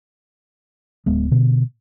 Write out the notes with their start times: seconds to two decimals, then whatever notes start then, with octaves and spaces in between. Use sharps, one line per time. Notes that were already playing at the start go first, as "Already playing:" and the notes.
1.06 D1 G#3 B3
1.31 B2 D3